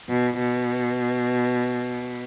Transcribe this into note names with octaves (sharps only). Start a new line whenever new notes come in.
B2
B2